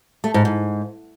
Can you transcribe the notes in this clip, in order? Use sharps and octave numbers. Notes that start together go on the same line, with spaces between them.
A3
G#2
G#2